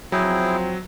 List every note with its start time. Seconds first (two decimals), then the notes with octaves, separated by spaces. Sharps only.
0.12 F3 F#3 C4 E4 G#4 G5